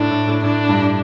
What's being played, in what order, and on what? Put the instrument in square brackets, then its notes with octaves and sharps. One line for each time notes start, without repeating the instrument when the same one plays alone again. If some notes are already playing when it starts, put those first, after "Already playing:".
Already playing: [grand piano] A2 [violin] D4
[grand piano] A2
A2
[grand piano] A2 [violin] D4
[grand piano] G2